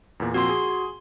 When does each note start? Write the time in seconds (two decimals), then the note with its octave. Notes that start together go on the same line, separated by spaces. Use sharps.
0.20 E2 A#2
0.34 A#2 F3 C4 F#4 C6
0.49 G#4